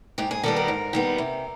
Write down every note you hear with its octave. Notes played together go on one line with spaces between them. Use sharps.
G#2 G4
G#4
D#3 G3 B3 A4
A#4
G#2
D#3 G3 B3
C3